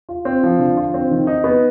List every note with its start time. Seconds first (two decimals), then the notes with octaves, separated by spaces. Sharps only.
0.09 F4
0.25 C4
0.43 F3
0.59 D3
0.77 F4
0.94 C4
1.11 D#3
1.27 D#4
1.44 B3